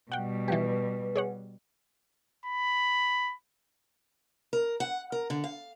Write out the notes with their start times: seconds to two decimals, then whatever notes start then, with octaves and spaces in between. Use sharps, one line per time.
0.12 B2 G3 F#5 G5
0.48 E3 F3 G4 B4
1.16 G#4 C#5 F#5
2.46 B5
4.53 A#4
4.80 F#5
5.12 A#4
5.30 D3
5.44 F5